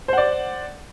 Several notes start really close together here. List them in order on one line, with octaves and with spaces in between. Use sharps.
C5 F#5 D5